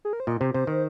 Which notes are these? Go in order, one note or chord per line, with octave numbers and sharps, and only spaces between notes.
G#4
A#4
C5
A#2 D#5
C3 C5
C3 C5
D#3